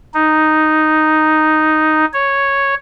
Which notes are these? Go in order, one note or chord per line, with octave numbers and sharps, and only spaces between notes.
D#4
C#5